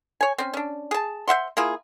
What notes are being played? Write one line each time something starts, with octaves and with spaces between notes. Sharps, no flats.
C#5 G#5
C4 C#4
C#4 D4
G#4 A5
C5 E5 F#5 C6
A#3 E4 F4 G#4